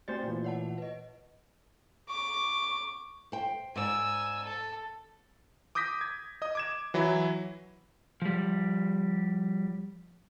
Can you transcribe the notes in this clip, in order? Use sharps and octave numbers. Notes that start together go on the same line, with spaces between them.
A3 C4 F#4 C5 D5 A6
A#2 E3
C#5 F#5 A5
B4 D#5
C#6 D6
C5 G5
G#2 D5 G#5 E6
A4
D6 D#6 G6 A#6 B6
G#6
D#5 D#6
D6 G#6 E7
E3 F#3 E4
F3 G3